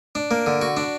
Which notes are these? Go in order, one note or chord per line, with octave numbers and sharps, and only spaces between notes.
D4
A#3
D3
F#4
D4